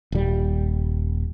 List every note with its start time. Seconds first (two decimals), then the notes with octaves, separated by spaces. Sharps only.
0.12 D#1 G3